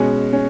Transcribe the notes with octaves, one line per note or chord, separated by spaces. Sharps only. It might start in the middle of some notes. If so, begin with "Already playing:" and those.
Already playing: B2 G#3 C#4
C#4